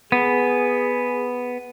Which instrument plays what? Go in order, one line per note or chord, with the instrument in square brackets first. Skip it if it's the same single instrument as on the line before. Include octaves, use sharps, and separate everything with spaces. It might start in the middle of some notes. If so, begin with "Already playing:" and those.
[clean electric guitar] B3 [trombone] G#4